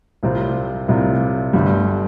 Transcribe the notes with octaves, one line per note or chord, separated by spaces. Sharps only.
C2 C3 G3 C4 F4
C2 C3 G3 C4 F4
G1 G2 D3 G3